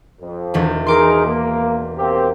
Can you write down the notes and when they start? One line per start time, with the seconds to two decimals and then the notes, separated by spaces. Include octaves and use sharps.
0.21 F2
0.54 E1 E2 D#3
0.87 D#4 G#4 A#4 C6 D6 C7
1.26 A#3
1.97 A#3 C4 G4